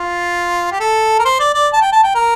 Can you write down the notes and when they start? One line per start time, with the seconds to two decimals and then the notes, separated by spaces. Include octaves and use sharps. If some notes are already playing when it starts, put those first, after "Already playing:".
Already playing: F4
0.72 G4
0.80 A4
1.19 A#4
1.25 C5
1.40 D5
1.54 D5
1.73 A5
1.82 G5
1.92 A5
2.04 G5
2.15 A#4